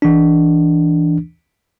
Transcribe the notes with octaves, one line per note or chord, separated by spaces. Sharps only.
E3 D4